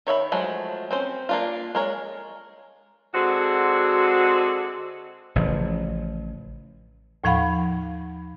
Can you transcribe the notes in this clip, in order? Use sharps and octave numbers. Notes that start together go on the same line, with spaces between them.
D#3 C#5 E5 B5
F3 F#3 G#3 A3
C4 C#4 C5
A#3 D4 F4
G#3 A#4 C#5
D3 G#3 C4 F#4
A1 C#3 F3
D#2 A2 F3 F5 F#5 B5